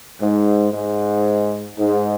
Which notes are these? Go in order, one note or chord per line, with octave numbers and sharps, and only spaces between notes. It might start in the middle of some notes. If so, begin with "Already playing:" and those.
G#2
G#2
G#2